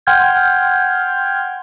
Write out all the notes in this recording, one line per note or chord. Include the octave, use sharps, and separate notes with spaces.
F#5 G5 C6 F6 G6 G#6